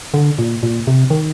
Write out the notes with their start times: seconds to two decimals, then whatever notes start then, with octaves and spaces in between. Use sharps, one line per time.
0.14 D3
0.38 A#2
0.63 A#2
0.87 C3
1.10 D#3